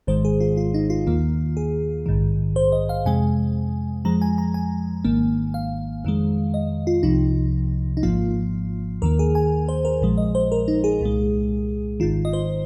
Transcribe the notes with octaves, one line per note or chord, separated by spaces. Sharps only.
G#1 G#2 D#3 G#3 C5
G#4
F4
F4
D#4
F4
D#2 D#3 A#3
G#4
A#1 G#2 D#3
C5
D#5
F5
F2 C3 G#3 G#5
F2 F3 G#3 A#5
G#5
A#5
G#5
G#1 G#2 D#3 A#3
F5
F2 D#3 G#3
D#5
F4
C2 C3 F3 D#4
D#4
G#1 G#2 F3 A#3 F4
D#2 D#3 A#3 A#4
G#4
G#5
C5
A#4
A#1 A#2 F3 G#3
D#5
C5
A#4
D#4
G#4
C2 A#2 G#3
G#1 G#2 D#3 F4
D#5
C5